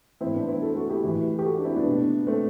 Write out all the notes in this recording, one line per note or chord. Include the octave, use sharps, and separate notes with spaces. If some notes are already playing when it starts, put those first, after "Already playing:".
A2 E3 C4 E4
B3 D4
C4 E4
F#4 A4
F#4 A4
E4 G4
A2 E3 E4 G4
G4
F#4 A4
D4
C4 E4
B3 D4
B2
A3 C4